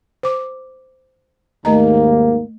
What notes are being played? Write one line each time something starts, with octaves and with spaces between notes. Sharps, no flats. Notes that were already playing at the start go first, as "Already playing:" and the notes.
C5 D6
D#2 G#2 A3 A#3 D#5 A#5